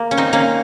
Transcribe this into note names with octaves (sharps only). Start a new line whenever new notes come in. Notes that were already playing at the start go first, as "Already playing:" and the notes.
Already playing: A#3
C#4
C4 D#4
A#3 C#4